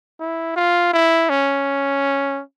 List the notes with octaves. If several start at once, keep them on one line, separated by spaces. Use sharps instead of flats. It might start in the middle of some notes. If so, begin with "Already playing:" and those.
E4
F4
E4
C#4